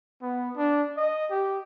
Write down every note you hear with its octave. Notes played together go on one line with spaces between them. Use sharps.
B3
D4
D#5
G4